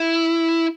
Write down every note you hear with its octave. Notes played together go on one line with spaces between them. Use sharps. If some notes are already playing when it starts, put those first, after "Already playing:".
Already playing: E4